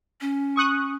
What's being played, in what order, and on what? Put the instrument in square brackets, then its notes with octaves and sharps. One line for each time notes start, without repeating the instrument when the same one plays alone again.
[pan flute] C#4
[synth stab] C#6 D#6 F#6